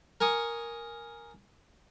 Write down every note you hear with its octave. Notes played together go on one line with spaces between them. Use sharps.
A#4 G#5 C#6 D#6